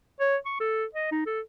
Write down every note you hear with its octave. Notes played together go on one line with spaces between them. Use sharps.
C#5
C#6
A4
D#5
D#4
A4